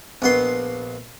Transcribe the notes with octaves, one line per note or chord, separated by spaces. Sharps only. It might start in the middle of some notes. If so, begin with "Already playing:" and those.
A#1 B3 C6